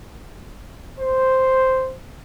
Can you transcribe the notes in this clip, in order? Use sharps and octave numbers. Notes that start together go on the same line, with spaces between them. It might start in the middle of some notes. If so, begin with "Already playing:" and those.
C5